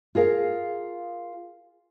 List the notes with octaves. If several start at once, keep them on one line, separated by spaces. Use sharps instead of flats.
F4 G#4 A#4 F5